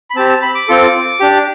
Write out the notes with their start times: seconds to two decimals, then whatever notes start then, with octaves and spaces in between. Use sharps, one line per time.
0.10 B5
0.15 C4 G4 A5
0.29 A5
0.42 B5
0.55 D6
0.68 C4 F4 A4
1.20 D4 G4